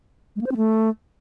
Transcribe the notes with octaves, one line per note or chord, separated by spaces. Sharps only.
G#3
A#3
C5
C4
A3